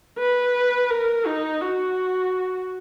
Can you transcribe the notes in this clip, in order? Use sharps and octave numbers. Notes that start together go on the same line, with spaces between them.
B4
A#4
D#4
F#4